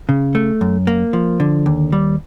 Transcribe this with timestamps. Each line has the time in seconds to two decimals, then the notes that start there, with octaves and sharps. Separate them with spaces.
0.09 C#3
0.35 A3
0.61 F#2
0.87 A#3
1.13 F3
1.40 D3
1.66 D#2
1.92 G3